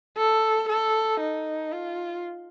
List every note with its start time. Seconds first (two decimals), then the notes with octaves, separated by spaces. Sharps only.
0.17 A4
0.69 A4
1.20 D#4
1.72 F4